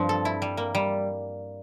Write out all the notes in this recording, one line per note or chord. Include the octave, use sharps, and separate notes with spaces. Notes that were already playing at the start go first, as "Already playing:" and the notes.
Already playing: G2 F3 C4
A4
E4
G3
A#3
G3